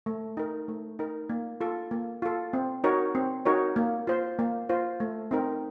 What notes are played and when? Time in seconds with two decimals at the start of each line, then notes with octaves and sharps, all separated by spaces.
0.06 A3
0.37 D#4 A#4
0.68 A3
0.99 D#4 A#4
1.30 A#3
1.61 F4 A4
1.91 A#3
2.22 F4 A4
2.53 C4
2.84 D#4 F#4 A#4 C#5
3.15 C4
3.45 D#4 F#4 A#4 C#5
3.76 A#3
4.07 F4 C5
4.39 A#3
4.69 F4 C5
5.00 A3
5.31 C4 D#4 A#4